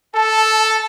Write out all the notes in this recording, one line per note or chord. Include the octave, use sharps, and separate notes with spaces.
A4 A5